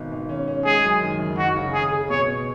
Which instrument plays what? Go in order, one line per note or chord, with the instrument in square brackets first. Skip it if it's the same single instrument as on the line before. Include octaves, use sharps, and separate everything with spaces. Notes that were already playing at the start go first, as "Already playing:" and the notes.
Already playing: [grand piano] G#1 B2
G#1
C#4
C#4
[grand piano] G#3 [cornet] G#4
[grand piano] F#2
D#3
F#1
[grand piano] D#4 [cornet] F#4
[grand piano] C#3
[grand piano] C#3 [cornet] G#4
[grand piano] G#4
[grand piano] B2 [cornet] C#5
[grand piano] B2